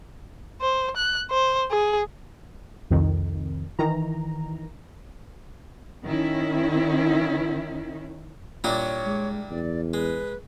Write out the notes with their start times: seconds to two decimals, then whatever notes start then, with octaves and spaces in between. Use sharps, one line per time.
0.62 C5
0.97 F#6
1.31 C5
1.71 G#4
2.90 C2 F2 D#3
3.79 D#3 E3 A#5
6.04 D#3 C#4 E4
8.64 A#2 G3 D4 E4 C#5
9.06 G#3
9.51 E2 D5
9.94 G#3 B4